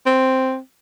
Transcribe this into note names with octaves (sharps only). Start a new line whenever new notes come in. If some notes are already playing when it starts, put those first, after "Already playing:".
C4